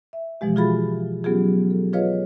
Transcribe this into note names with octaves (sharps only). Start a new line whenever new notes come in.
E5
B2 E3 F3 G#3 G4
F4 F#4 G#4 F5 B5 A6
F#3 B3 C#4 F4 G4 G#4
A4
F4 G#4 B4 C#5 D#5 F5